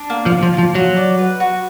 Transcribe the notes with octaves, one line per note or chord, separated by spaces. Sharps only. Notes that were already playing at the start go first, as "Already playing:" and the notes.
Already playing: D4
A#3
F3
A#3
F3
F4
F3
F#3 F#4
D5
B4
F#4